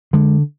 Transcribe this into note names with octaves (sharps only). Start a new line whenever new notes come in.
D3 G#3